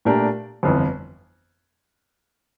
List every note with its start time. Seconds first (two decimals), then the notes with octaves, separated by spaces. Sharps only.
0.05 A#2 A3 D4 G4 A#4
0.63 G1 F2 E3